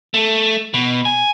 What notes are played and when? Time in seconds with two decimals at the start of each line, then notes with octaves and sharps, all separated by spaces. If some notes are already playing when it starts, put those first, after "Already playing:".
0.14 A3
0.74 B2
1.05 G#5